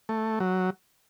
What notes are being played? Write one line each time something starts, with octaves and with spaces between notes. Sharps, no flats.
A3
F#3